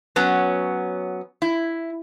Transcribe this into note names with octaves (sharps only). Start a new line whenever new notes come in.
F#3 B3 C#4
E4